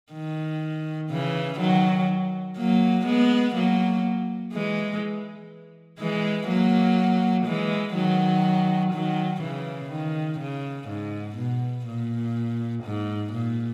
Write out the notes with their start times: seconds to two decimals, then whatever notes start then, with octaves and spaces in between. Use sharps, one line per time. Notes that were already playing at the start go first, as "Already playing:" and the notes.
0.13 D#3
1.10 C#3 E3
1.59 D#3 F#3
2.57 F#3 A#3
3.06 G#3 B3
3.55 F#3 A#3
4.53 E3 G#3
5.99 E3 G#3
6.48 F#3 A#3
7.46 E3 G#3
7.95 D#3 F#3
8.93 D#3 F#3
9.42 C#3 E3
9.91 D#3
10.39 C#3
10.89 G#2
11.38 B2
11.87 A#2
12.84 G#2
13.33 A#2